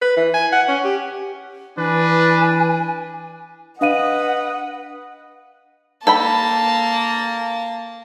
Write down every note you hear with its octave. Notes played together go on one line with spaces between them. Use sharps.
B4
E3
G#5
F#5
C#4
G4
E3 D4 B4 G#5
D4 B4 D#5 F5 F#5 D#7
A#3 A4 G5 A5 B5